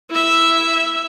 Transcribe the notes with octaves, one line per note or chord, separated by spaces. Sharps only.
E4 E5